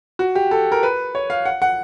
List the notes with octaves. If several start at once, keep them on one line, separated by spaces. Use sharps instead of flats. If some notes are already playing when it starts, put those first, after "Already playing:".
F#4
G4
A4
A#4
B4
C#5
F5
F#5
F#5